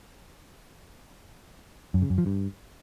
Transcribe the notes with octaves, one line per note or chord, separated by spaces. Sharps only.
F#2
C#3
F#2
F3
G2